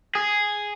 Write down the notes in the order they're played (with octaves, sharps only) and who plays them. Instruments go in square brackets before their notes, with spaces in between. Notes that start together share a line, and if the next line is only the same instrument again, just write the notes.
[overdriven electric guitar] G#4